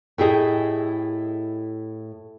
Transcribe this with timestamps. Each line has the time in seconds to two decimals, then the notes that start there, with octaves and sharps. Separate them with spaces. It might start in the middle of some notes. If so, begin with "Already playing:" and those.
0.18 A2 E4 G4 G#4 D#5